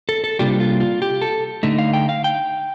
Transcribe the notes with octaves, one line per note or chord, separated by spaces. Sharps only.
A4
A4
C3 G3 A#3 D4 F4 G4
F4
F4
G4
A4
D3 A3 D#4
F5
G5
F5
G5